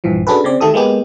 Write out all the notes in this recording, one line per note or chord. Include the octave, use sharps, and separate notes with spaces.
A#1 G2 E3 F3
C#4 D4 F#4 G#4 A4 B4
C#3 C4 D5
D#3 A3 G4 A4 D#6
G#3 A#3 B3 G4 G#4